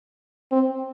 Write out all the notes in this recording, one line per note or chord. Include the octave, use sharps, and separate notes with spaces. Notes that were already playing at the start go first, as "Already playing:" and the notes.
C4